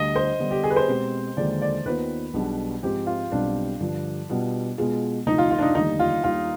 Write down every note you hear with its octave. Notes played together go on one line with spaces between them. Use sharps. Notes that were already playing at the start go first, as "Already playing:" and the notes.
Already playing: D2 D3 G3 D4 D#5
C5
D3 G3 B3
G4
G#4
B4
C5
B2 G#3 C4 G4
D#2 D3 F3 G#3 D5
D5
D#2 D#3 B3 F4 B4 C5
B1 B2 G3 D4 G#4
G#2 F3 G#3 C4 G4
F4
B1 B2 G3 C4 D4
G2 D3 F3
B2 G3 B3 F4
B2 G#3 B3 F4 G#4
D2 C3 F3 D#4
F4
F4
D4
D#4
F1 D#2 D3 G3 D#4
F4
D#2 D#3 G3 F4